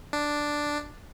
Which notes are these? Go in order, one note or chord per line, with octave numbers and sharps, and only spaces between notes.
D4